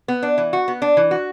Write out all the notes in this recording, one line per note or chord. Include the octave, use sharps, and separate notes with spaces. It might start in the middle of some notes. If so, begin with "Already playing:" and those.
B3
D4
E3
F#4
B3
D4
E3
F#4